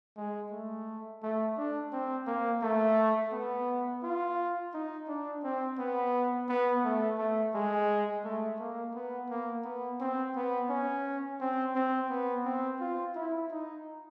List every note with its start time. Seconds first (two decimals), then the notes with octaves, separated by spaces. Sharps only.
0.17 G#3
0.52 A3
1.23 A3
1.57 D4
1.92 C4
2.27 A#3
2.62 A3
3.32 B3
4.03 F4
4.74 D#4
5.08 D4
5.44 C4
5.78 B3
6.48 B3
6.84 A3
7.18 A3
7.55 G#3
8.24 A3
8.59 A#3
8.95 B3
9.29 A#3
9.64 B3
10.00 C4
10.35 B3
10.69 C#4
11.41 C4
11.75 C4
12.10 B3
12.45 C4
12.81 F4
13.15 E4
13.51 D#4